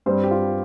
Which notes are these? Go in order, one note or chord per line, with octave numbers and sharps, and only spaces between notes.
G2 G3 C4 C5
G4
F4